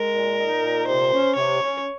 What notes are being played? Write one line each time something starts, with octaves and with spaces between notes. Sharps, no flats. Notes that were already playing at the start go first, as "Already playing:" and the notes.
Already playing: G#3 A#4
A#2
D#4
A#2
C3 C5
C#4
C3 C#5
C#4